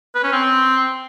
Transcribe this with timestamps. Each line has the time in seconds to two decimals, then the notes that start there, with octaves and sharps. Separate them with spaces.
0.15 B4
0.24 C#4
0.32 C4